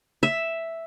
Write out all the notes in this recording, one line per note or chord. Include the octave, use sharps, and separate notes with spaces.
E5